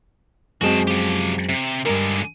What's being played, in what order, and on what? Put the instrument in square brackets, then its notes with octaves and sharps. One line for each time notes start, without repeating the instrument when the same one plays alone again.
[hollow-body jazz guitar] F#2 G#3 C4 [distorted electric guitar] F#4 A5
[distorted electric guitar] F3 G4
C3
[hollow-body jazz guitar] G2 A#4 [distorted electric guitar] D3 G#3